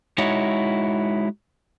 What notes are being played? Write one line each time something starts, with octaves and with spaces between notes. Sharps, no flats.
G#3 D#4 E4 F#4 C#5